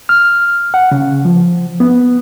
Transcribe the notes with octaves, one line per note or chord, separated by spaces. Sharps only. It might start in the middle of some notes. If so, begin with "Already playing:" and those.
F6
F#5
C#3
F3
B3